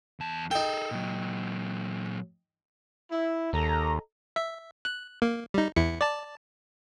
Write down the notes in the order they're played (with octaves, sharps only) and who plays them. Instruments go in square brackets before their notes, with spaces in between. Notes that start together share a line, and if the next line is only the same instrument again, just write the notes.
[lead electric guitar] E2 A5
[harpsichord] D#4 G5 [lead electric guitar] G#4 A4
[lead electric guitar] A#2 F#3
[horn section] E4
[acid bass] D#2 [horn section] A4 D#5 A#5
[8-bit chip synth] E5
F#6
A#3
G3 D#4
E2 E4 C#7
D5 A5